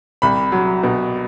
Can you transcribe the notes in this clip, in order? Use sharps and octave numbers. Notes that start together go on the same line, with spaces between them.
C2 B5
F#3
B2